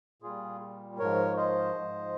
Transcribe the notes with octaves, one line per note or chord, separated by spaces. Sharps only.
A#2 G3 F4 G#4
G#2 F3 A#4 C#5
C5 D#5
G#2 F3